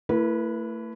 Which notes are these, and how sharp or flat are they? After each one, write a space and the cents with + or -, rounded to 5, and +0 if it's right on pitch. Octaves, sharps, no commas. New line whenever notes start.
A3 +35 E4 +20 B4 -25